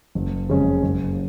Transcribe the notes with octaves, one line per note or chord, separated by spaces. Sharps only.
F#1
F2 C#3 G#3 C#4
F#1